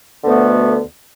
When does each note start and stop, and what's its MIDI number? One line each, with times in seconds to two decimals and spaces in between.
0.24 0.81 38
0.24 0.81 47
0.24 0.81 50
0.24 0.81 57
0.24 0.81 59